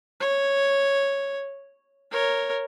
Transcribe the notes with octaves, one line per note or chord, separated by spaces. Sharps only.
C#5
A#4 C#5